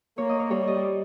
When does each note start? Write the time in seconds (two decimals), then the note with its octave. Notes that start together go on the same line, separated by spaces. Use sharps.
0.18 A#3 C#5
0.29 D#5
0.40 C#5
0.50 G3 C#5
0.68 D#5